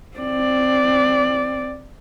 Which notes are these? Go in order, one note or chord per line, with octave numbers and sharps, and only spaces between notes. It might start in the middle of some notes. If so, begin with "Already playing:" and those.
C4 D5